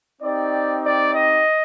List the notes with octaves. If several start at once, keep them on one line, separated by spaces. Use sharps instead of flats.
C4 D#4 G4 D5
D5
D#5